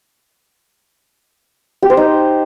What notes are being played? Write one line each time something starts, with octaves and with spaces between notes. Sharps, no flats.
G4
C5
D#4